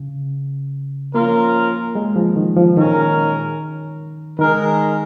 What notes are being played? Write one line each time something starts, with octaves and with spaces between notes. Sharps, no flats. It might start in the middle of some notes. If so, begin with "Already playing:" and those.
Already playing: C#3
F3 A#3 C#4 F4 A#4
G#3
F3
D#3
F3
A#2 D#3 G#3 C#4 A#4
D#3 G#3 D#4 A#4